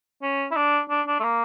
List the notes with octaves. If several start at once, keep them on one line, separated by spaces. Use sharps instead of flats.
C#4
E4
D4
D4
D4
A3
A#3